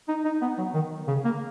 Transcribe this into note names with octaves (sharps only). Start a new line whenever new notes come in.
D#4
D#4
B3
F#3
D#3
C#3
A#3